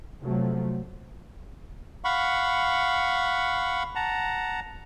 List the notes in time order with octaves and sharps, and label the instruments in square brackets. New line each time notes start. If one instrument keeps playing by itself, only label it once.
[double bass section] C3 F3 F#3 A3
[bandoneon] F5 F#5 B5 C#6
F#5 A5 A#5